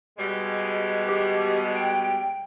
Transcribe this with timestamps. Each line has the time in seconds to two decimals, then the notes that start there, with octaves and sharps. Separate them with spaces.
0.18 B2 G3 G#3
1.09 G4
1.76 G5